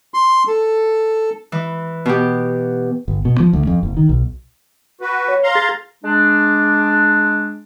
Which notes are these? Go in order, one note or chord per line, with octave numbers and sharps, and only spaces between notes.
C6
A4
E3
B2 G4
G1
B2
F3
D2
F2
F#1
D#3
B1
F#4 B4
C#5
F5 A#5 C6
G#4 A6
G#3 D4